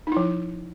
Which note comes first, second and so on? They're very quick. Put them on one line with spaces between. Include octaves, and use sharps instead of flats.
D#4 E4 F3